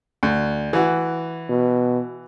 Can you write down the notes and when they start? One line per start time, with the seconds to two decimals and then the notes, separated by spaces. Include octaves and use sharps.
0.23 D2
0.73 E3 F#4
1.49 B2